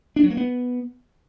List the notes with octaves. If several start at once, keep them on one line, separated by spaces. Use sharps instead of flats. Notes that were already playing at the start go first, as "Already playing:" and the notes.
D4
F#3
A#3
B3